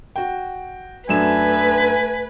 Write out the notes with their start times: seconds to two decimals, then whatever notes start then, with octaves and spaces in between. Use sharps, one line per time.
0.16 F#4 G5
1.09 F#2 A3 D4 B4 G#5 E7